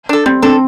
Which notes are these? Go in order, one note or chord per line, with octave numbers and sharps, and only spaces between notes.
D4 A4
G3 C4
C4 D4 A4